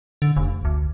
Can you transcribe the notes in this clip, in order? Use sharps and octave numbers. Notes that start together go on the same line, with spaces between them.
D3
F1
D2